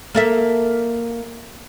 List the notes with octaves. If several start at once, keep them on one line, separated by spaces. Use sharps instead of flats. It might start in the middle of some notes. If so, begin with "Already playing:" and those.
A#3 A4 E5